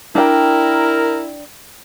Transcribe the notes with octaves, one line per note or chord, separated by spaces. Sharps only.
D4 E4 A#4 G5